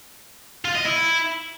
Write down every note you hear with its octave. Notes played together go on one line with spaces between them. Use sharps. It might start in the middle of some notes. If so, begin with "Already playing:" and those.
F4
D#5
E4